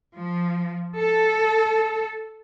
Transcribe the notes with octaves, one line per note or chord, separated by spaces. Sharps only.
F3
A4